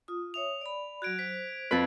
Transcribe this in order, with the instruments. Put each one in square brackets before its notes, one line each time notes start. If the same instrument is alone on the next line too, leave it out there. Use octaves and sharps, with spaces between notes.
[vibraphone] F4 D#6
[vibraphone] C#5 E5 D#6 [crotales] F7
[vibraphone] D5 B5
[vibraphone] F#3 F#4 [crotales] F#6 G#6 D7
[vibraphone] C5 [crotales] B6
[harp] F2 B4 [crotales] G#6 A6 B6